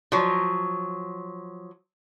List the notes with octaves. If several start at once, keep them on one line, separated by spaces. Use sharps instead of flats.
F3 F#3